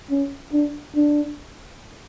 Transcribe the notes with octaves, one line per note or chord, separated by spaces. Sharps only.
C#4
D4
D4